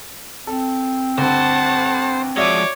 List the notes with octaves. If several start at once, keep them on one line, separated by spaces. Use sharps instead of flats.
C4 A4
D2 G2 C5 F#5 A5
F3 G#3 F#4 C#5 D5 E5 D6